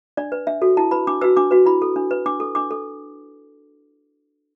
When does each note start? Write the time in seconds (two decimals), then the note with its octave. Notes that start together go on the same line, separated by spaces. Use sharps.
0.17 D4 D5
0.32 B4
0.47 D4 E5
0.62 F#4 A4
0.77 E4 A5
0.91 B4 B5
1.07 D4 D6
1.21 F#4 B4 E6
1.37 D4 D6
1.51 F#4 B4
1.66 E4 B5
1.82 A4
1.96 D4
2.11 B4
2.26 D4 D6
2.40 A4
2.55 D4 D6
2.71 A4